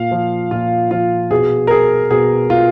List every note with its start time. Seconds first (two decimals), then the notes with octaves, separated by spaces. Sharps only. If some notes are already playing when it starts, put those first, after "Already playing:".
Already playing: A#2 F5
0.11 F3
0.51 A#2 F4
0.91 F3 F4
1.31 B2 G#4
1.67 A#4
1.71 G#4
2.10 B2 G#4
2.50 F4